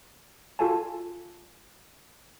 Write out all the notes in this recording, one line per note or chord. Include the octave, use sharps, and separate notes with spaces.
F4 F#4 A4 F5 G#5 A5